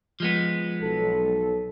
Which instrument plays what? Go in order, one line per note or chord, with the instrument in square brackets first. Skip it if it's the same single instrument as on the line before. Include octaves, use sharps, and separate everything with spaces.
[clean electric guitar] F3 G#3 B3
[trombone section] B1 A4